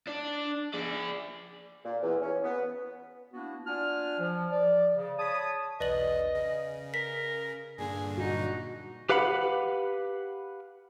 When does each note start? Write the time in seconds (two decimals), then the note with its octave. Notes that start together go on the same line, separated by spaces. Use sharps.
0.07 D4 D5
0.74 G#4 D5
1.83 A#2
2.02 E2
2.21 C#4
2.43 B3
3.33 A#3 B3 D4 E4 F#4
3.67 D4 F4 D5 F#5 G#5 F6
4.19 F3
4.52 D5
4.96 C#3
5.19 C#5 A5 B5 D#6
5.80 B1 E2 B4 D5 D#5 F#7
6.35 C#3
6.94 A#4 B6
7.78 G2 A#2 D3 G#4
8.18 D#4 F#4
9.09 G4 B4 F5 F#5 B5